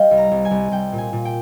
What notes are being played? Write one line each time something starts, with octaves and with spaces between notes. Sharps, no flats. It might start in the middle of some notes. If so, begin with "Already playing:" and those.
Already playing: G3 D#5 F5 G5
C2
A#5
C2
G#5
C2
C2 G5
A#2
G#5
A#2
G5